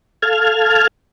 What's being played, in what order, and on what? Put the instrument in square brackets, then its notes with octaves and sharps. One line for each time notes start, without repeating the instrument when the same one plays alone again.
[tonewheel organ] A4 F5 A5 F6 G#6